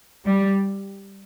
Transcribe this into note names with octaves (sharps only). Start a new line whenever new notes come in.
G3